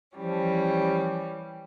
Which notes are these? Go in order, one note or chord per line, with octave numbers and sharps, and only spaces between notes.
E3 F3 G3 C#4